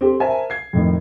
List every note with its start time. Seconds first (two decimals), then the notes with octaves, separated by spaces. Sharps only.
0.01 C4 G4 A4
0.20 A#4 C5 E5 G#5 A5
0.50 G#6 C7
0.73 F2 A2 D#3